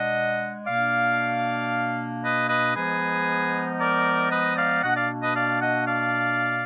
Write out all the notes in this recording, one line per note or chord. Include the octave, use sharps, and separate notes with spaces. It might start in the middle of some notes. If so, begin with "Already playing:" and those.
Already playing: B2 G#3 D4 D#5 F#5
B2 A#3 D4 D5 F5
B4 D#5
B4 D#5
F3 G#3 B3 D#4 G#4 B4
A#4 D5
B4 D#5
D5 F5
B2 A#3 D4 D#5 F#5
D5 F5
B4 D#5
D5 F5
D#5 F#5
D5 F5